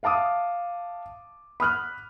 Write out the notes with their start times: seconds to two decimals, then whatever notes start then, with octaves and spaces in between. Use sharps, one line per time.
0.03 E5 F5 A5 D6 D#6
1.60 B5 D#6 F6 F#6